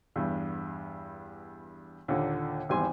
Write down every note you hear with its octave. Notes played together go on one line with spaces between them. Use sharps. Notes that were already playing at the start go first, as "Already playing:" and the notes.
E2 G2
D#2 A#2 D3
G#1 E2 G3 G#5 C6